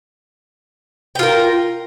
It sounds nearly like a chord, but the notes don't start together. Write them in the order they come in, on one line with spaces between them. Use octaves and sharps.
G5 F4 A#4